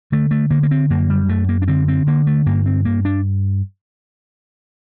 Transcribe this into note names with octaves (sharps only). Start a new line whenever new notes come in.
D3 A3
A3
D3 A#3
A#3
C4
F#2 A#3
G3
F#2 A3
A#3
D4
D3 C4
C4
D3 A#3
A3
G2 A#3
C4
G2 A#3
D4